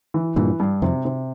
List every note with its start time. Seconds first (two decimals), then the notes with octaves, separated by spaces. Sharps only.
0.14 E3
0.36 G2 A#2 E3
0.60 G2
0.82 F2 C3
1.05 C3